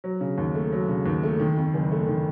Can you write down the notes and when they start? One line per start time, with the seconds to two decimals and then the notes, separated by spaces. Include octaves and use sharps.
0.04 F#3
0.21 C#3
0.38 D#2
0.55 A3
0.72 F#3
0.89 C#3
1.06 D#2
1.23 A3
1.40 D#3
1.57 F2
1.74 F#1
1.92 A3
2.09 D#3